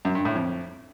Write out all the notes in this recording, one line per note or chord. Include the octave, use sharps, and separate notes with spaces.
F#2
G2
A2
F2